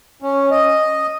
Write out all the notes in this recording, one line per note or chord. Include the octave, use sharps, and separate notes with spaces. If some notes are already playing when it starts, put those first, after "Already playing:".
C#4
D#5